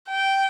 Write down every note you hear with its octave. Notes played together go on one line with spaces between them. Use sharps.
G5